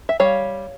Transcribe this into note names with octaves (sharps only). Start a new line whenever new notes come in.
E5
G3 C#5 F5